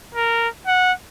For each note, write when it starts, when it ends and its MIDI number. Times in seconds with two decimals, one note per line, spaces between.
0.15 0.48 70
0.67 0.92 78